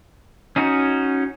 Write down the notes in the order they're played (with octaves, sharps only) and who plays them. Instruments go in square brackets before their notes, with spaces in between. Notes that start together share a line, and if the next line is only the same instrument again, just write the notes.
[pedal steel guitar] C#4 D#4 F#4